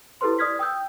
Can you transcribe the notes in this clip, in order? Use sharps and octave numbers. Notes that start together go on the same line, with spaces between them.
E4 G4 A4 B4 C5 C6
D5 D#6 F6 G#6 B6
G5 D#6 E6 G6